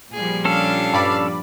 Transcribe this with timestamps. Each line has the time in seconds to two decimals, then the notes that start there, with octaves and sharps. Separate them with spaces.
0.13 A#2 F3 G3 G#4
0.45 C#4 D4 A4 F5
0.93 G2 D5 B5